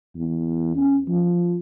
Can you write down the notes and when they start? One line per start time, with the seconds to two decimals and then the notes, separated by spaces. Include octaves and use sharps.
0.16 E2
0.76 C#4
1.08 F3